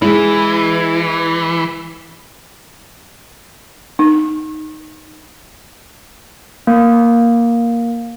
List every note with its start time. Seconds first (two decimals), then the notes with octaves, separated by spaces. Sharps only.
0.02 E3 G#3 E4
3.99 D#4
6.67 A#3